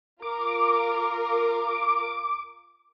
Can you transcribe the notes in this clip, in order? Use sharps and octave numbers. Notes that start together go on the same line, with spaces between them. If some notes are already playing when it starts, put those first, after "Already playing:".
F4 A#4 D6